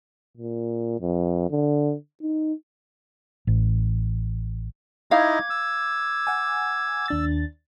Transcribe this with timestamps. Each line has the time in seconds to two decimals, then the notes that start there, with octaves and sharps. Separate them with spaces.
0.37 A#2
1.01 F2
1.50 D3
2.22 D#4
3.47 A1
5.11 D#4 E4 D#5 F5 D6 G#6
5.50 E6
6.27 F#5 G#5
7.08 D#2 D4 A6